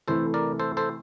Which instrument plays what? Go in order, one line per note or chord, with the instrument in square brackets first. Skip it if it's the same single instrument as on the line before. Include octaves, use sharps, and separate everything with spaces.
[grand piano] C3 E3 A3 E4 [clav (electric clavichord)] A4 C5
[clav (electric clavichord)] A#4 D5
A4 C5
A4 C5